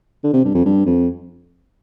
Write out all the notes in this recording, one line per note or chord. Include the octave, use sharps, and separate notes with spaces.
D3
C3
G2
F2
G2
F2